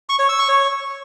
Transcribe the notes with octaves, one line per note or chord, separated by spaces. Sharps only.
C#6
C#5
E6
C#6
C#5